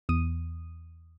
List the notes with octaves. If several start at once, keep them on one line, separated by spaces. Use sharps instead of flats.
E2 D#6 D#7